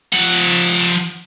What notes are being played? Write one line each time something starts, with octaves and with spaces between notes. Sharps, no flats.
F3 F#5